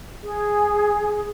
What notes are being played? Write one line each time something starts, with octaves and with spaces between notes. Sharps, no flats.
G#4